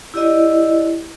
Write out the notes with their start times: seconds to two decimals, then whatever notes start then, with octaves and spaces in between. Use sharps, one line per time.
0.14 E4 G4 D5 D#5